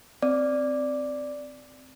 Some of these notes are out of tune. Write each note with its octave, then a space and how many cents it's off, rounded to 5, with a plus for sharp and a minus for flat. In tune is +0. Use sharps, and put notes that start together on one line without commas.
C4 -10 D5 +0